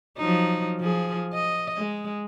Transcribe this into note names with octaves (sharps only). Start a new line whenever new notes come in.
F3 F#3 D#4
F3 G#4
D#5
G#3